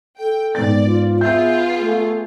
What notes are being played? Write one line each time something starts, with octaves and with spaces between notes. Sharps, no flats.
A4 G5
G#2 B3 D5 A6
F4
B3 F4 G#4 E5 G6
A3